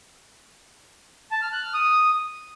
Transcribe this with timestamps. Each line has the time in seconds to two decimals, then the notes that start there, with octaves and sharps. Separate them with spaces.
1.31 A5
1.42 F6
1.52 F#6
1.63 F6
1.74 D#6